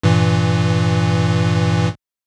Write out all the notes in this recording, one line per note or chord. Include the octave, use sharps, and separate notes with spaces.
G2 A#2 E3